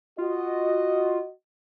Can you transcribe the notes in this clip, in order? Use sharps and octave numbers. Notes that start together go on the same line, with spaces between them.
F4 F#4 D#5